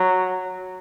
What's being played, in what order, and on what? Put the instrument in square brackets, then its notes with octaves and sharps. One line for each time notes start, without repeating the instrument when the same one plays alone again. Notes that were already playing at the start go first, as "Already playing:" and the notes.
Already playing: [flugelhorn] F#3